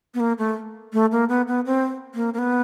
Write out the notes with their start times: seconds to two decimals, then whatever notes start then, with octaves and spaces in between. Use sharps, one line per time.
0.14 B3
0.20 A#3
0.38 A3
0.93 A3
1.12 A#3
1.29 B3
1.48 B3
1.66 C4
2.15 A#3
2.34 A#3
2.38 B3